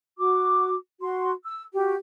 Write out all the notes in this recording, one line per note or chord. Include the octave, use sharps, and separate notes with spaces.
F#4 D6
F#4 C6
E6
F#4 G4